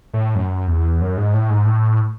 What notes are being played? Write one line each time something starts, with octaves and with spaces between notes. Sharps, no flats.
A2
F#2
E2
F#2
G#2
A2
G#2
A2